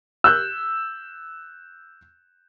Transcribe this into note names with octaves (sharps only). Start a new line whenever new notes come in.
E6 F#6 G6